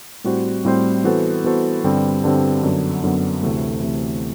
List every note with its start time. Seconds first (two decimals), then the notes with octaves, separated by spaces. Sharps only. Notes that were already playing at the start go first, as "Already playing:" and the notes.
0.24 A2 G3 C4 F#4 C5
0.65 A2 G3 C4 F#4 C5
1.04 E3 B3 F#4 A4 C5
1.44 E3 B3 F#4 A4 C5
1.84 G2 D3 G3 C4
2.24 G2 D3 G3 C4
2.63 F#2 D3 F#3 B3
3.03 F#2 D3 F#3 B3
3.43 D2 C3 E3 A3
3.83 D2 C3 E3 A3